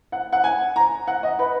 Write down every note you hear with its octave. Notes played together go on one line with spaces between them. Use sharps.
F#5
F#5
G#5
A#5
F#5
D#5
B4